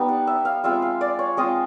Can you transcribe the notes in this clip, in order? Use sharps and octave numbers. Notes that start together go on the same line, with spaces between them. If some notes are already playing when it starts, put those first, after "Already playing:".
Already playing: G3 B3 D#4
F#5
E5
F5
G#3 C4 F4 E5
F5
D5
C#5
G#3 C4 F4 D#5